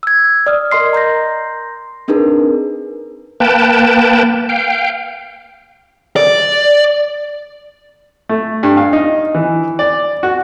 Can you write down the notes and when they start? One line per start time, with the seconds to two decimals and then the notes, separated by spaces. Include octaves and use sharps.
0.03 E6 G#6
0.46 D5 D#6 F6
0.72 A#4 D#5 C6 C7
0.93 A#5 C6 G6 A#6
2.08 C4 D4 D#4 G#4 A#4 B4
3.40 A#3 B4 G5 A5
4.49 F5 G5
6.16 D5
8.29 A3
8.63 G2
8.77 F5
8.93 D#4
9.35 E3
9.79 D5
10.23 F#4